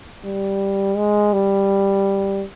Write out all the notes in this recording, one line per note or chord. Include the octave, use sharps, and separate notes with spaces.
G3
G#3
G3